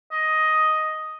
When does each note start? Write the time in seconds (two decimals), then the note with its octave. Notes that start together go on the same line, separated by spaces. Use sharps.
0.12 D#5